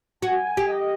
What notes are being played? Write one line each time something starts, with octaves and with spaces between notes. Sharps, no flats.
F#4 G#5
G#5
G4
D#5